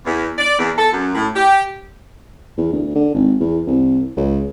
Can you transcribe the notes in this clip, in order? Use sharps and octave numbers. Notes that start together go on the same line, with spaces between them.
E2
D5
E2
A4
F#2
A2
G4
E2
D2
D3
G#1
E2
C2
C#2